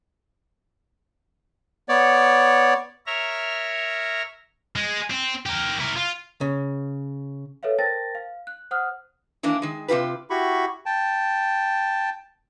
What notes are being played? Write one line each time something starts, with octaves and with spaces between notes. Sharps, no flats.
B3 C#5 D5
A#4 C#5 E5 A#5 F6
G#3
C4
G4 A#4
E4 A#4
F4
C#3
A4 B4 C#5 E5 F5
A#4 C5 G5 A5 A6 A#6
F5
F#6
C5 F#5 D#6 F6 F#6
D#3 E3 A#3 D4
D#3 G#3
C3 F3 F4 G4 B4
E4 F#4 G4 B5 C#6
G5 A5